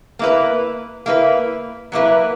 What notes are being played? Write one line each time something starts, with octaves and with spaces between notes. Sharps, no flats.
A#3 E4 B4
A#3 E4 B4
F#3 A#3 E4 B4